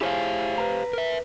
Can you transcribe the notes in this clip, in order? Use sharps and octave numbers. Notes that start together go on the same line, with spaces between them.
E4 G4 G#4 C5 C#5 F5
B4 A#5
A#4 E5